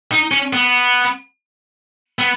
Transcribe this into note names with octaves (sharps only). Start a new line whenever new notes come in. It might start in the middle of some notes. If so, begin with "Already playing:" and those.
D#4
C#4
B3
B3